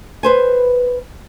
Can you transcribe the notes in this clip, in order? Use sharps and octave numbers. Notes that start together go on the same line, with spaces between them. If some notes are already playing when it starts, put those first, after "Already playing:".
B4 C5 G#5